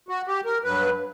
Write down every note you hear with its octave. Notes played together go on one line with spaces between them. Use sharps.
F#4
G4
A#4
G2 F#3 B4